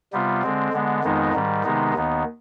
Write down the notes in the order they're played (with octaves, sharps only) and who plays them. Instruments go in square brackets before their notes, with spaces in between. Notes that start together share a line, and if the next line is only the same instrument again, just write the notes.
[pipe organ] C3 G3 B3 F4
D3 G#3 C4
D3 G#3 B3
F2 D#3 G#3 B3 D#4
G#2 D#3 G3
C3 D#3 G#3 B3 D#4
D#2 D#3 B3